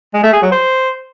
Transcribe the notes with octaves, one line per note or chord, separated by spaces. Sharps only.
G#3
A3
G#4
F#3
C5